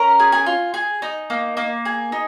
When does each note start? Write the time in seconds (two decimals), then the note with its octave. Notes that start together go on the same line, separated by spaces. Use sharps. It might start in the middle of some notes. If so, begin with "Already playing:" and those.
Already playing: C#4 A#4 A#5
0.20 G#4
0.32 G#4 G#5
0.46 F4
0.74 G#4
1.02 D#4
1.30 A#3
1.57 A#3
1.85 G#4
2.12 D#4